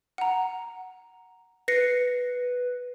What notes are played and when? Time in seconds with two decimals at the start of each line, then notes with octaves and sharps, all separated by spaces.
0.18 F#5 A#5
1.68 B4 A#6 C7 C#7